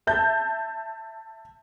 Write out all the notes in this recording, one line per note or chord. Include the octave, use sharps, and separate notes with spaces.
E5 A5 G6